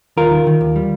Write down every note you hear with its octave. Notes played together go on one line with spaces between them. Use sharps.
D#2 F4 A#4
D#3
D#3
D#2
G3